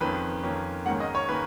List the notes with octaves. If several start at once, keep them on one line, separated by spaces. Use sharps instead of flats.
F2 D#3 A#3 C#4 B4
F2 D#3 A#3 C#4
G#2 D#3 A#3 C#4 F#5
D#5
C#5
D#3 A#3 C#4 B4